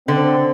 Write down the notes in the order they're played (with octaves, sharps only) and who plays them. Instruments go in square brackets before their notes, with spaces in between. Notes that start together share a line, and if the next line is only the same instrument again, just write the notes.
[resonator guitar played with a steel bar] D3 [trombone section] C4